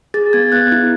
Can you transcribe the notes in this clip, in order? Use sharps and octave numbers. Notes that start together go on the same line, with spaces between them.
G#4 A6
B3 G#6
B3 F#6
E4